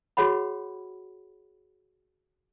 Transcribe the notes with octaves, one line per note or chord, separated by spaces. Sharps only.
F#4 G#4 C#5 F#5 B5